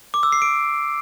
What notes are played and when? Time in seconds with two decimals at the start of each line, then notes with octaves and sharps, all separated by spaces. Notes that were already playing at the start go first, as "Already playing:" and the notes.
0.14 D6
0.23 E6
0.32 C7
0.42 D7